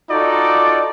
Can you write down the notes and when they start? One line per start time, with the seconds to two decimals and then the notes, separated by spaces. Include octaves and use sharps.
0.10 D#4 F4 F#4 A4 D5